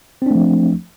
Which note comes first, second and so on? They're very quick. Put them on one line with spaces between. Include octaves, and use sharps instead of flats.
C4 D4 A3 F3